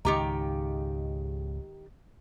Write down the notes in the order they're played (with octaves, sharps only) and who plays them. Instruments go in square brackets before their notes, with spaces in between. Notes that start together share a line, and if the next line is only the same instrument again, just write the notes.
[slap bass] C#2 G#2 [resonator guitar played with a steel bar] D#3 G4 A#5